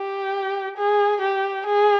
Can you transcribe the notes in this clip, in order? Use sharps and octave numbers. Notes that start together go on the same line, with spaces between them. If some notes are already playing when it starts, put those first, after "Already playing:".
Already playing: G4
G#4
G4
G#4